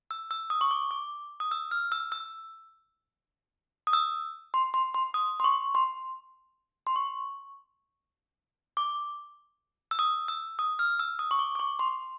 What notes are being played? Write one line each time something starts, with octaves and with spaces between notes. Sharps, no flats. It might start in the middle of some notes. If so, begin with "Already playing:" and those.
E6
E6
D#6
C#6
D6
D6
D#6
E6
F6
E6
E6
D#6
E6
C6
C6
C6
D#6
C6
C#6
C6
C6
C#6
D6
E6
D#6
E6
D#6
F6
E6
D#6
C#6
D6
D6
C#6
C6